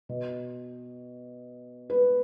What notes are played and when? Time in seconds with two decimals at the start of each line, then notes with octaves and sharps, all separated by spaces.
0.09 B2
1.90 B4